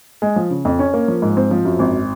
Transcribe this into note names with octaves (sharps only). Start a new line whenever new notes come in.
G#3
F3
C#3
F2
C#4
A#3
F3
G#2
C4
F3
F#2
G#1